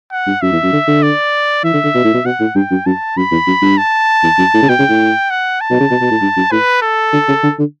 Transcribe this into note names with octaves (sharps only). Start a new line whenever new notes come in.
F#5
G2
F#2 E5
E2
F#2
D3
D3
D5
E3 E5
D3
D3
B2
A2
B2
B2 F#5
A2
G2 G5
F#2
F#2 A5
F#2 B5
E2
F#2
G2
A5
E2
F#2
A2
C#3
B2 G5
C#3
A2
F#5
A5
B2
C#3
B2
B2
A2
G2
F#2
A2 B4
A4
D3
C#3
D3
D3